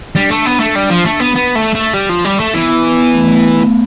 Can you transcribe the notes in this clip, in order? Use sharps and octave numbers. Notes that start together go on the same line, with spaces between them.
G3 D4
A3
B3
A3
G3
F3
A3
B3
B3
A3
A3
G3
F3
G3
A3
E3 B3
B3
B3
B3
A3